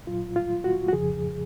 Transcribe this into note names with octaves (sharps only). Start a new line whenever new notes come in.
A#2 F#3 F4
F4
F#4
F#4
F2 C#3 F3 G#4